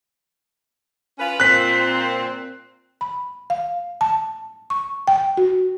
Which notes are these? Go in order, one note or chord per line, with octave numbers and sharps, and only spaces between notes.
C#4 F4 B4
A#2 C4 F#6 B6
B5
F5
A5
C#6
G5
F#4